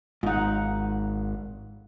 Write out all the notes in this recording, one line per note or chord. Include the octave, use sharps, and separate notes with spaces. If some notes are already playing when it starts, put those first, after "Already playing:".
G#1 G#2 D#4 F4 F#5